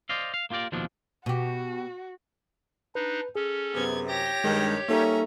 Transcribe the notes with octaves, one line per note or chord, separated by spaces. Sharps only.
C5 D5 D#5 F5
F5
A#3 F4 G4 A#4 D5
D#2 B2 D#3 F3 C4 D4
B2 F#4 G4
D4 D#4 B4
C#4 G#4 A4
F#2 C3 B3 G#6
G4 C#5 G5 G6 A#6
G2 D#3 G#3
G3 A#3 C#4 D#4 A4 E5 A#5